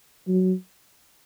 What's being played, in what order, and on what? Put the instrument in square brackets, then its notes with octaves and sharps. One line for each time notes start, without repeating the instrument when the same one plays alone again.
[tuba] F#3